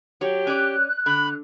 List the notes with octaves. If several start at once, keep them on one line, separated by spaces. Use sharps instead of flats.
F#3 G4 C#5
C#4 D5 F#6
D3 B5